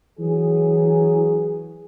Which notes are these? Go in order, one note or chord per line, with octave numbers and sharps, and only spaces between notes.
E3 F#3 G#4